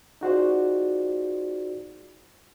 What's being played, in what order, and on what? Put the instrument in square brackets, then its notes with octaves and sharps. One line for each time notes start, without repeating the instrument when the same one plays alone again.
[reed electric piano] D#4 F4 F#4 G#4 C5 D5